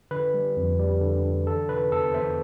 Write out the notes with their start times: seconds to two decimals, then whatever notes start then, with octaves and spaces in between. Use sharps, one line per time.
0.11 D3 B4
0.34 G3
0.57 F2
0.79 G3
1.01 D3
1.25 D3
1.47 E3 A4
1.69 C3 B4
1.92 E2 A4
2.14 E2 C5 E5